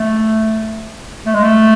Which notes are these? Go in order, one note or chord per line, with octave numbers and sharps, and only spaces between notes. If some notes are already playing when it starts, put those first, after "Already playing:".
Already playing: A3
A3
G#3
A3